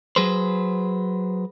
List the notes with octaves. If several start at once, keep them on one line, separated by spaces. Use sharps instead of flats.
F#3 G#4 B4 C5